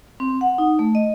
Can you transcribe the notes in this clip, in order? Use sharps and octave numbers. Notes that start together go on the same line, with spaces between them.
C4
F#5
D#4
A3
D#5